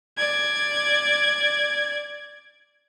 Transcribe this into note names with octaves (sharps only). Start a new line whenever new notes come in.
D5 G#6